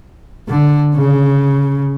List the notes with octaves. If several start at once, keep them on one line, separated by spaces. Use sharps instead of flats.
D3
C#3